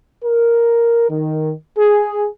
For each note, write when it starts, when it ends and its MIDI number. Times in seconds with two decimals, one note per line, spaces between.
0.24 1.08 70
1.10 1.52 51
1.78 2.26 68